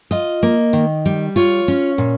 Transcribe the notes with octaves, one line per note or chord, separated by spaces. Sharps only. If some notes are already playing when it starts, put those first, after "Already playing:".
F4 D#5
A#3
D#3
G3
F4 C#5
C#4
A#2